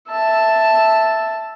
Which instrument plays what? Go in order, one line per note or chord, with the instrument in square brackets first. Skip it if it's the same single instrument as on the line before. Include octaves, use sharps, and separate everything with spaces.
[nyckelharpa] E5 A5